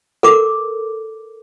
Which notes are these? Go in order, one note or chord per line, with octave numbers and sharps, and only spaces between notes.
A4 A#4 D6